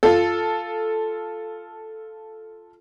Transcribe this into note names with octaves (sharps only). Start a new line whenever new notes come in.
F4 A4